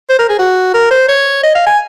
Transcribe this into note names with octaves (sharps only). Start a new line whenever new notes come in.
C5
A#4
G#4
F#4
A#4
C5
C#5
D#5
F5
G#5